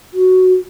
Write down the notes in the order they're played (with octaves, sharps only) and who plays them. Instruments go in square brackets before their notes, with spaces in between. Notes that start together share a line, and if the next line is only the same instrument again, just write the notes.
[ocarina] F#4